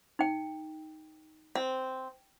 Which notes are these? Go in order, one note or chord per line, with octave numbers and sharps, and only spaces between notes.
D#4 G5
C4